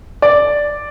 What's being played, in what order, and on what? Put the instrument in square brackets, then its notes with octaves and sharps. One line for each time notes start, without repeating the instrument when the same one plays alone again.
[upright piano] D5